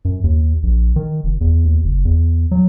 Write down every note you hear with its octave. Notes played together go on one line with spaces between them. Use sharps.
F#2
D#2
A#1
D#3
F1
E2
D#2
F#1
E2
F#3